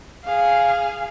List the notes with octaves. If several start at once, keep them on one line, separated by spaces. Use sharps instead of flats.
G#4 F5